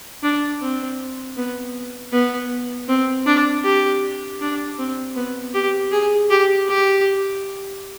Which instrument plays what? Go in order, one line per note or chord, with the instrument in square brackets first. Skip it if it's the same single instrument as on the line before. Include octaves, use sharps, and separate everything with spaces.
[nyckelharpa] D4
C4
B3
B3
C4
D4
G4
D4
C4
B3
G4
G#4
G4
G4